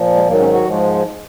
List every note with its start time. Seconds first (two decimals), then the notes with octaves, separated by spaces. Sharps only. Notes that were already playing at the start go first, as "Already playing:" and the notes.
Already playing: A#2 F3
0.16 G#3
0.27 G#2 D#3 F#3 A#3
0.40 C#4
0.53 F#4
0.65 G#2 F3 G#3